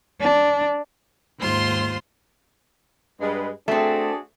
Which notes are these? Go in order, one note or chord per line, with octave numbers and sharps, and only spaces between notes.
D4
D#2 G#2 F4 C5 C6
G2 G#3 B4
A3 C4 D4 F#4 G#4